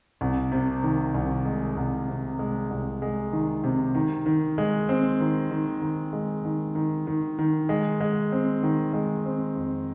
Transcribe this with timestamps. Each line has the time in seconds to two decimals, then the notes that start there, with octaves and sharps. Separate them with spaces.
0.21 C2
0.52 C3
0.83 D#3
1.14 C2
1.45 G#3
1.77 C2
2.08 C3
2.39 G#3
2.70 C2
3.02 G#3
3.33 D#3
3.64 C3
3.95 D#3
4.26 D#3
4.58 G#3
4.89 C4
5.20 D#3
5.51 D#3
5.82 D#3
6.13 G#3
6.45 D#3
6.75 D#3
7.07 D#3
7.39 D#3
7.69 G#3
8.00 G#3
8.32 C4
8.63 D#3
8.93 G#3
9.25 C4
9.56 F2